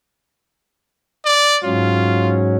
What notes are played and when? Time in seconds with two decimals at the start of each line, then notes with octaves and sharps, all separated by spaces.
1.25 D5
1.64 G#2 F#3 C#4 F4